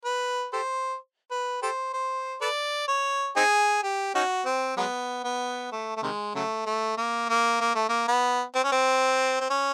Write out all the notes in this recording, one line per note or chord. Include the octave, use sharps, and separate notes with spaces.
B4
G4 A4 C5
B4
G4 A4 C5
C5
A4 B4 D5
C#5
C4 D#4 G#4
G4
C#4 D#4 F#4
C4
F#3 G#3 B3
B3
A3
A3
C3 D#3 G#3
C#3 F#3 A3
A3
A#3
A#3
A#3
A3
A#3
B3
C4
C#4
C4
C4
C#4